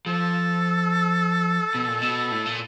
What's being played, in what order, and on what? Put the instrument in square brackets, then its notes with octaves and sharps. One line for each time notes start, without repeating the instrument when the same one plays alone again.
[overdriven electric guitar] F3 [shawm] A4
[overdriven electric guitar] B2
A#2
B2
A2
A#2